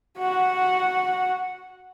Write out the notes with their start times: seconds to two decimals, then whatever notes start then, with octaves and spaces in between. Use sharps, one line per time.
0.18 F#4 F#5